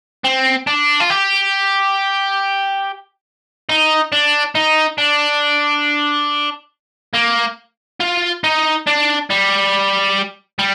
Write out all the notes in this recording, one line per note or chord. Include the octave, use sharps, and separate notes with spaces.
C4
D4
F4
G4
D#4
D4
D#4
D4
A#3
F4
D#4
D4
G3
G3